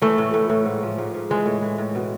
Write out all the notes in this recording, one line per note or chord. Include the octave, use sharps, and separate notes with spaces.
E3 A3
A2
A2
A2
G#2
F3
G#2
G#2
E3 G#3
A2
E3
A2
B2